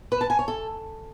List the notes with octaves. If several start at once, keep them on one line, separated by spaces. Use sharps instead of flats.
B4
A5
G#5
C#5
A4